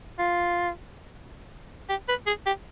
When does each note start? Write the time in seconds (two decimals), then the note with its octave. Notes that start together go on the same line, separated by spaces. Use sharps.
0.18 F4
1.89 G4
2.08 B4
2.27 G#4
2.46 G4